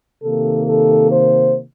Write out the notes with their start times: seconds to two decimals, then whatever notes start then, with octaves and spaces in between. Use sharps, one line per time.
0.23 C3 D#3 A#3 A4
0.66 A4
1.10 C5